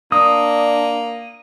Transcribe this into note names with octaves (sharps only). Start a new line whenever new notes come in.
A#3 D4 D#6